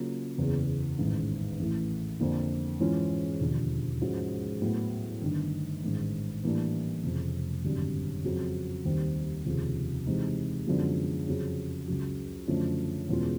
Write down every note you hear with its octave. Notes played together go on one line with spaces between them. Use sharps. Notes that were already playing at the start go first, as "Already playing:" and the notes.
Already playing: C#3 F#3 A#3 C#4 F4
F#1 E2 C#3
A1 G#2 D#3
A1 A2 E3 A3
F2 D3 F3 A#3
G#2 E3 G#3 C#4 F4
E1 D#2 D3 F3
G#2 F3 G#3 C#4 F#4
A2 F#3 B3
G1 G2 D#3
A1 G#2 D#3
A2 E3 G3 A#3 D4
F1 F2 C#3
G#1 F#2 D3 G3
F2 C#3 F#3
D#2 D#3 G3 C4
F1 D#2 C#3 F3
C3 E3 G#3 C4 D#4
F#2 D3 F3 G#3 B3
F2 C#3 F#3
C#2 C#3 F#3
F#2 D3 F3 A3
E2 B2 G#3 C#4 F4